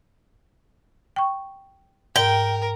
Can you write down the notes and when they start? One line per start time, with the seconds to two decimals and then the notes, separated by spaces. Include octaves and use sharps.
1.16 G5 C#6
2.16 G#2 A#4 G5